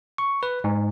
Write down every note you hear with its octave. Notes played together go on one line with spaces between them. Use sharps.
C#6
B4
G#2